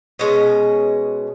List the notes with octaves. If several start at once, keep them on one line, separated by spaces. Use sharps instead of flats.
B2 G#3 C#4 D#5